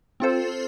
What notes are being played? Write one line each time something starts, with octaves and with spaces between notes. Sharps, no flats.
C4 F4 A4 C5